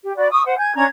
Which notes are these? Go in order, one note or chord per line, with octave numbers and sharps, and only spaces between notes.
G4
F#4 D5 B5
C#6 D#6 E6
C5 F#5
G#5 G6 G#6
C#4 D4 A#5 G#6